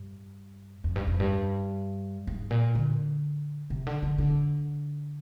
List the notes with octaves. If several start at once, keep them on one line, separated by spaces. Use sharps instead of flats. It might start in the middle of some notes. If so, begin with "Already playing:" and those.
Already playing: G2
F2
G2
F2
G2
G#2
A#2
D3
C3
D3
D3
D3